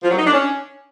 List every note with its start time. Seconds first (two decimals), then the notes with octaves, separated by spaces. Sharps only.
0.03 F3
0.10 F#3
0.17 D#4
0.25 D4
0.32 C#4